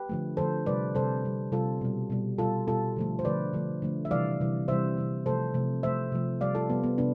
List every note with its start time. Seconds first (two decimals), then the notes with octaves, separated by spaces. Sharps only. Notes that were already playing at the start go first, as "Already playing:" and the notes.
Already playing: G4 B4
0.09 D3 F3 A3
0.37 D3 F3 A3 A4 C5
0.66 C3 G3 B4 D5
0.95 C3 G3 A4 C5
1.24 C3 G3
1.52 C3 G3 F4 A4
1.81 B2 G3
2.10 B2 G3
2.38 B2 G3 F4 A4
2.67 B2 G3 F4 A4
2.96 D3 F3 A3
3.19 C5
3.25 D3 F3 A3 B4 D5
3.53 D3 F3 A3
3.82 D3 F3 A3
4.05 E5
4.11 C3 E3 G3 D5 F5
4.40 C3 E3 G3
4.68 C3 E3 G3 C5 E5
4.97 C3 E3 G3
5.26 C3 F3 A3 A4 C5
5.54 C3 F3 A3
5.83 C3 F3 A3 C5 E5
6.12 C3 F3 A3
6.41 C3 G3 D5 F5
6.55 F4 A4
6.70 C3 G3 B3
6.84 B3
6.98 C3 B3 D4